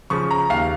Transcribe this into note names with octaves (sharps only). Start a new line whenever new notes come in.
C#3 F3 C#6
A#5
D#2 F5